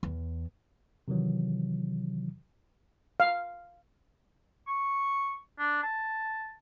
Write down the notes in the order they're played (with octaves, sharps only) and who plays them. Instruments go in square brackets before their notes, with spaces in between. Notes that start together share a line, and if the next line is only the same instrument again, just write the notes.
[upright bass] E2
[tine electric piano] C3 D#3 E3 F#3
[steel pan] F5
[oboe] C#6
D4
A5